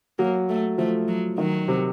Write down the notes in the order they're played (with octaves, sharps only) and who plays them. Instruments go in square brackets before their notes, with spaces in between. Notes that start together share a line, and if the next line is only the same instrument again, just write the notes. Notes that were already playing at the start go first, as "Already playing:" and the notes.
[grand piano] F#3 [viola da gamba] A#3
[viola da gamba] A3
[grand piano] F3 [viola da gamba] A3
[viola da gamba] F#3
[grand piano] D#3 [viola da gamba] F#3
[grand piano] C3